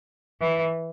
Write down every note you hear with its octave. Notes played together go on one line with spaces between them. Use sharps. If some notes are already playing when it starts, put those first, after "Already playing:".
E3